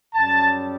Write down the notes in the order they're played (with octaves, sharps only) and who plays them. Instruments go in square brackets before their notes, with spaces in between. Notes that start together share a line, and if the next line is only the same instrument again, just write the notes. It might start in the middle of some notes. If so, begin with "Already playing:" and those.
[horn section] F#2 C#3 G3 A5